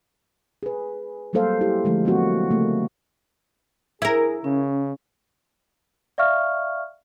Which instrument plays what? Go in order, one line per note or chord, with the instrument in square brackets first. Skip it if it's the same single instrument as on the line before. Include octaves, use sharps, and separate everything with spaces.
[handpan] G#4 B4
F#3 G3 A#3 A4 C5 F5
E4 G4
D3 E3 F3 G#3 A3
F#3 A#3 C4 F#4
C#3 A3 A#3
[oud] E4 A#4 [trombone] G#4
[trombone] C#3 [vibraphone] C#4
[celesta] D5 E5 F5 C#6 F6